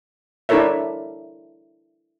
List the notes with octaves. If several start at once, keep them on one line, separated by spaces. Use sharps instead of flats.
D4 E4 A4 A#4 C#5 E5